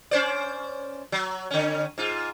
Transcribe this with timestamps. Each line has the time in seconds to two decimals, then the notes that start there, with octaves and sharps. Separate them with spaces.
0.11 C#4 C5 D5
1.12 F#3
1.51 D3 C#4
1.98 G#2 F4